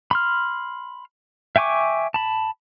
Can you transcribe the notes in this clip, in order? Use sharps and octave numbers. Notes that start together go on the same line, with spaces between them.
B5 C6 F6
E5 G5 G#5 C#6 D6
A5 B5